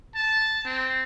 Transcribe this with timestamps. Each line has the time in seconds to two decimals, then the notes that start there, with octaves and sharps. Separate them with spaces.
0.15 A5
0.65 C4